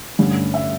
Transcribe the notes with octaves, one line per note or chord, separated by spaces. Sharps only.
G2 D3 A3 C#4
E5